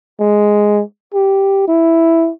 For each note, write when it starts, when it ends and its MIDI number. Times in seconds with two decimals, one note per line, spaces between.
0.20 0.83 56
1.14 1.65 67
1.68 2.31 64